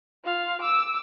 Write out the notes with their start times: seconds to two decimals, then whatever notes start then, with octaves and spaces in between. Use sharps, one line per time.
0.24 F4 F5
0.61 D6 E6